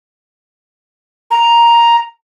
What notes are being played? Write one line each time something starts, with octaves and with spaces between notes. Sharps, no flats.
A#5